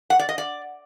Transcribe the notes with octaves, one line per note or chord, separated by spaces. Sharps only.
F#5
D5
D#5
D5